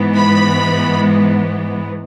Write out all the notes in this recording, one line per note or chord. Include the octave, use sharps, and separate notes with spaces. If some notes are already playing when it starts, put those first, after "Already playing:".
Already playing: G#2 E3 B3
B5